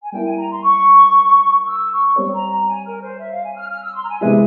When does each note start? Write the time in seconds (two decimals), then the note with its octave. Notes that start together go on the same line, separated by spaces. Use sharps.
0.02 G#5
0.12 G3 A#3 E4 A#4 G5
0.25 G#5
0.38 A#5
0.51 C6
0.63 C#6
1.66 E6
1.91 C#6
2.16 G3 C4 G4 C#5
2.33 A#5
2.50 A#5
2.68 G#5
2.85 A#4
3.02 C5
3.19 E5
3.31 F5
3.44 G#5
3.57 F6
3.70 F6
3.83 E6
3.95 C6
4.03 A#5
4.09 G#5
4.21 C3 E3 G#3 E4 G#5